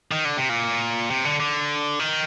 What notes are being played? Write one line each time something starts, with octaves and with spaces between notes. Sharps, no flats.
D#3
D3
C3
A#2
C3
D3
D3
D#3